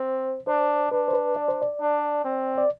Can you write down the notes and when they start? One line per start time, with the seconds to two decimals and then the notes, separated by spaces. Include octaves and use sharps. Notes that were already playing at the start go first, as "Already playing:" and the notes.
Already playing: C4 C5
0.47 D4 C5
0.91 D4 B4
1.08 C5
1.13 B4
1.36 D5
1.48 C5
1.62 D5
1.80 D4
2.24 C4
2.58 D5